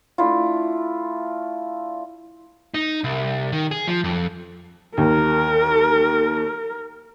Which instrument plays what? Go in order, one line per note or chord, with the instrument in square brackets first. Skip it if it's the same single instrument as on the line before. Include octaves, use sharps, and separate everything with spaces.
[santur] A3 D4 E4 F4
[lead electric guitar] D#4
C2
D#3
G#4
F3
F2
[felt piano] D#2 [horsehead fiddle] A#4